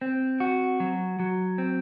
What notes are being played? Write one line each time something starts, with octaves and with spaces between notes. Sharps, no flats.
C4
F#4
F#3
F#3
C4